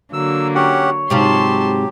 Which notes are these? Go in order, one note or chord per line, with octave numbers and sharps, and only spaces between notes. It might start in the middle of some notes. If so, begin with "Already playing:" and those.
D3 F#3 A#3 E6
C#4 G4 C#5 F#5
G#2 C3 F#3 F4 G4 A5 C6